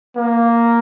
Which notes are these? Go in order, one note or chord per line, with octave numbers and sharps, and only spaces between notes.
A#3